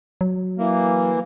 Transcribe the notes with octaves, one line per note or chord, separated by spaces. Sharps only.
F#3
E3 A#3